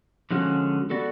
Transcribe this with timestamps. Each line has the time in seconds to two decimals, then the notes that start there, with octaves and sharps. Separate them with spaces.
0.31 D3 F3 G#3 C#4 F#4
0.90 B3 F#4 A4 D5